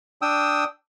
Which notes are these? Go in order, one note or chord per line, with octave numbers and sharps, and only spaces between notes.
D4 G5 D#6 E6